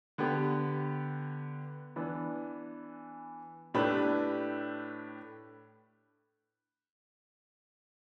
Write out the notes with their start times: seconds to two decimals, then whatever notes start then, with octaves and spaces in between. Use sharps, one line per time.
0.18 D3 B3 G4
1.96 E3 B3 D4
3.74 A2 A3 D4 G4 B4